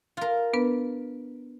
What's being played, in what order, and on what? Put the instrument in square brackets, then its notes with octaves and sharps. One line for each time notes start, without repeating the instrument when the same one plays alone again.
[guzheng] F4 A#4
[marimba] B3 D4 B4